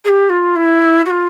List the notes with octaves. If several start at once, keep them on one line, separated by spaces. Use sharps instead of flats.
G#4
G4
F4
E4
F#4
F4